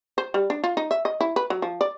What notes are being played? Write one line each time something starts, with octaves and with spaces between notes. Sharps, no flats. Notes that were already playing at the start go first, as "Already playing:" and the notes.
C5
G3
D4
F4
D#4
E5
D#5
E4
B4
F#3
F3
D5